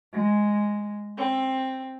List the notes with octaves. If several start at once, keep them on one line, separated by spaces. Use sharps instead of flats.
G#3
C4